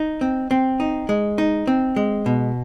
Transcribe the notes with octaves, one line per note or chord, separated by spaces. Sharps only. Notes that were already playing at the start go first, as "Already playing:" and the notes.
Already playing: D#4
C4
C4
D#4
G#3
D#4
C4
G#3
B2